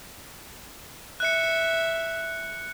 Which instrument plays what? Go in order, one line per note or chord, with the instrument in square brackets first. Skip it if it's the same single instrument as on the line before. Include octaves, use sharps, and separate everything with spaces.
[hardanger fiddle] E5 [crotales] F#6 C#7